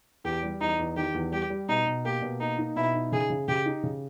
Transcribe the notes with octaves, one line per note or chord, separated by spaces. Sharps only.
E2 G4
G3
E2 D#4
E2
D#3 G4
E2
G3 G4
G3
B2 D#4
B2
A#3 G4
B2
A#3 D#4
D#4
B2 E4
D#4
C#3 G#4
C#3
C#3 G4
D#4
C#3